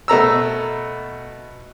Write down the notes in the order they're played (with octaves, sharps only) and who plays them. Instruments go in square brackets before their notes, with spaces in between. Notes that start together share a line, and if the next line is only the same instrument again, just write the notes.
[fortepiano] B2 A3 A#5 E6